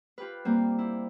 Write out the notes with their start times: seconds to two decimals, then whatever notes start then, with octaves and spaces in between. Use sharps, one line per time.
0.18 F4 G4 B4
0.45 G3 A#3 C4
0.78 E4